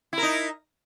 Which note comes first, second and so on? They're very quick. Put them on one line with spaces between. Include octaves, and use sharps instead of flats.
E4 A#4 D#4